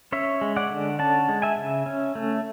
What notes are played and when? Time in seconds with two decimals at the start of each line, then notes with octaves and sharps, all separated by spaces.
0.12 C#4 C#5 E5
0.41 G#3
0.56 D5 F#5
0.70 D3
0.99 C#4 F#5 A5
1.29 G#3
1.42 E5 G#5
1.57 C#3
1.86 C#4
2.15 A3